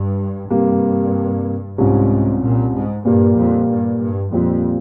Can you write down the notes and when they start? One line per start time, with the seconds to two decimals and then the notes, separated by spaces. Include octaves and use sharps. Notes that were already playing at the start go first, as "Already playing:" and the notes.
Already playing: G2
0.50 G2 C3 G3 A#3
1.78 C2 G#2 C3 G3 C#4 F4
2.42 A#2
2.74 G#2
3.05 G2 A#2 G3 A#3
3.37 F2
3.69 G2
4.00 G2
4.32 F2 A#2 G3 C4 F4